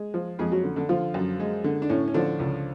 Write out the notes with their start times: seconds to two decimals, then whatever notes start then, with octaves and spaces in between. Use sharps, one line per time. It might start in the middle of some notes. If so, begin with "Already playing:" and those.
Already playing: G#3
0.14 F3
0.39 F2 G#3 G#4
0.52 F#3 F#4
0.64 D3
0.76 D3 D4
0.89 D3 F3 F4
1.14 F#2
1.40 G#3
1.64 D3
1.82 D4
1.89 A2 C#4
2.08 C#4
2.14 D3 F3 D4
2.39 C#2